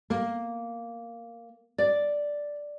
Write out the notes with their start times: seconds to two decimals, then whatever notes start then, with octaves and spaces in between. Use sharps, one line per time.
0.10 A#3
1.78 D5